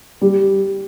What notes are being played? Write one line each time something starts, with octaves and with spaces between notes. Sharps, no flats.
G3